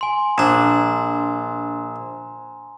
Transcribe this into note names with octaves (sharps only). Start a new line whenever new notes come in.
G#5 C6
A#1 D4 A#5